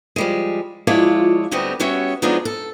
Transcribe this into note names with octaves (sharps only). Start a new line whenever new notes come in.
F3 G3 G#3
F3 G#3 E4 F4 C#5 D5
D2 G3 A3 B3 C4 D#5
G3 B3 C#4 F#4 C#5 E5
F3 F#3 G#3 B3 D4 D#4
A4